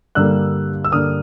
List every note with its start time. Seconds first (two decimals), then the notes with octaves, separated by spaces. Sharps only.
0.15 G2 D3 G3 A#3 D4 E6 F#6
0.84 E6
0.92 G2 D3 G3 A#3 D4 D#6 F6